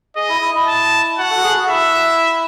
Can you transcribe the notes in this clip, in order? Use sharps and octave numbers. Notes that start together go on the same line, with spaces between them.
G#4 D#5
E4
E4
E4
A5
F#4 F#5
A4
F#4
G#4
F#4
E4 E5